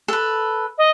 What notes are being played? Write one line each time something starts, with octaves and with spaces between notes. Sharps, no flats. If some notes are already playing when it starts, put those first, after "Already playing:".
A4 B4
D#5